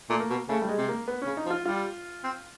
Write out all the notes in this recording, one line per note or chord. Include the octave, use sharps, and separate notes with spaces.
A#2 A3
A#3
B2
C#3 A3
G3
G#3
C3
A#3
B3
C#3 C#4
D#4
F3
F4
G3 F4
C4